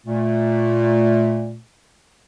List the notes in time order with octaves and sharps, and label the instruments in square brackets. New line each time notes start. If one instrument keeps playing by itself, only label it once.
[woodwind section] A#2 A3